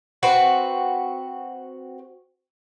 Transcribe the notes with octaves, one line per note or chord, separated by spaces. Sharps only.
C4 F#4 B4